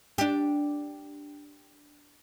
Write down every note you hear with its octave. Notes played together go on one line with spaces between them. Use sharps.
D4 G4